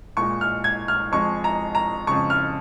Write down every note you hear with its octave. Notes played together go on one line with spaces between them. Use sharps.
A#2 G#3 C#6
F6
G#6
F6
F2 F3 G#3 C#6
A#5
A#5
F2 C#3 G#3 C#6
F6